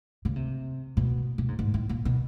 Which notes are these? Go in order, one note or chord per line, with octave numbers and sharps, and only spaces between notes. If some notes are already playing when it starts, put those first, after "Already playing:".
C#3
C3
B2
B2
G#2
G#2
A2
A#2
B2